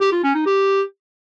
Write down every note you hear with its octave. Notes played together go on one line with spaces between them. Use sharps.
G4
F4
C#4
D#4
G4